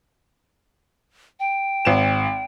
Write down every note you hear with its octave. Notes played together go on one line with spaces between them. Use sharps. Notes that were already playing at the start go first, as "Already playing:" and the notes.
G5
G#1 E7